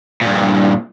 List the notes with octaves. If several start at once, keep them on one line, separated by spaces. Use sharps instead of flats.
G2 A#2